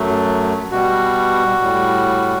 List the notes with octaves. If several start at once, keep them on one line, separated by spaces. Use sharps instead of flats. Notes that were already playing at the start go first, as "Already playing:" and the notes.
Already playing: F#2 F#3 A3
B2 G3 F#4
A2 G3